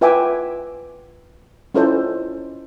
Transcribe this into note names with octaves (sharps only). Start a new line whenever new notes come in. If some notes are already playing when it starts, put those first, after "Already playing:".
F4 B4 E5 G5 G#5 D6
C#4 E4 F4 A4 C5 D#5